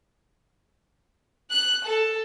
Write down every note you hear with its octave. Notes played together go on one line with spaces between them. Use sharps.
F#6
A4